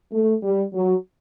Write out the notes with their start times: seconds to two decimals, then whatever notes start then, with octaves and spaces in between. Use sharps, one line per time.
0.12 A3
0.43 G3
0.73 F#3